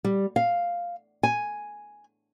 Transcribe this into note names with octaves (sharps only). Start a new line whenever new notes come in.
G3
F5
G#5